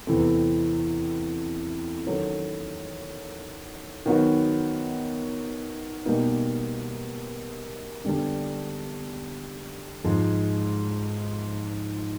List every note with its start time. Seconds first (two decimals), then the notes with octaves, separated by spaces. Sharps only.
0.07 E2 C3 E3 A3 C4
2.06 D#3 F#3 A3 C#4
4.06 D#3 F#3 B3 D#4 F#4
6.05 B2 G3 A#3 D#4
8.05 D3 G3 B3 D4
10.04 G#2 F3 G#3